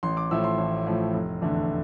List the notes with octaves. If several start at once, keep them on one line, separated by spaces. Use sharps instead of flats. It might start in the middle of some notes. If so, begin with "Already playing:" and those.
A1 C6
D6
A2 F3 A3 E6
C6
A1
A2 F3 A3
F1
E2 D3 A3 D4